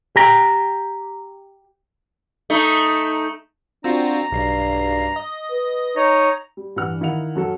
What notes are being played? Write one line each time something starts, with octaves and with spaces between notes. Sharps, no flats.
G4 A#5
A3 D#4
C4 D4 F4 F#4 A#5
B1 G2 C7
D#5
B4
D#4 C#5 D#5 A#5
G3
G2 E3 D4 F#5 F6
D#3 E4 D#5 F5 F#5 F7
F#2 F#3 A4 F#5